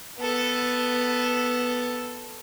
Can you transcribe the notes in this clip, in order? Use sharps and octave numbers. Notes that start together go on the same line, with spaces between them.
B3 A4